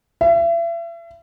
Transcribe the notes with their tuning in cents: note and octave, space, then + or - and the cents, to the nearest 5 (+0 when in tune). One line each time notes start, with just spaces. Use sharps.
E5 +40